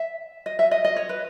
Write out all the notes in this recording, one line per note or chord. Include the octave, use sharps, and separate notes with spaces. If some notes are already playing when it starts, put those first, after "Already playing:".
Already playing: E5
D#5
E5
D#5
D#5
C#5
B4